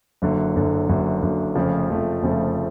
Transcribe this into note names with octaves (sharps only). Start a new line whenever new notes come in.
F#1 F#2 D3
F#1 F#2 D3
F#1 F#2 D3
F#1 F#2 D3
F1 F2 C#3 F3 A3
F1 F2 C#3 F3 A3
F1 F2 C#3 F3 A3